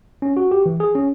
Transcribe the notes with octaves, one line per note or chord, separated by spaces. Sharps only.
C#4
F#4
G4
E3
G#4
C#4